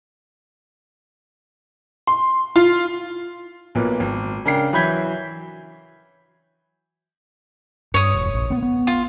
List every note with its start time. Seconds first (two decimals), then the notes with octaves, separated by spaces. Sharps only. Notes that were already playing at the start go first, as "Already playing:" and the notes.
2.07 C6
2.56 F4
3.75 B1 A#2 A#3 B4
4.00 G#1
4.45 C#3 D4 A#4 G5 C7
4.73 E3 F#3 B5 G6 G#6 B6
7.94 G2 C#5 D#6
8.14 E1
8.34 A#1
8.50 B3 C4
8.62 B3
8.87 F4